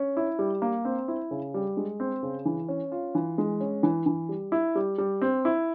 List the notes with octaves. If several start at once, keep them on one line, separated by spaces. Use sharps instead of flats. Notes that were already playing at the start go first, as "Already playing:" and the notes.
Already playing: C#4
E4
G3
A#3
C4
E4
C#3
G3
G#3
C4
C#3
E3
C#4
F4
E3
G#3
C#4
E3
E3
G3
E4
G3
G3
C4
E4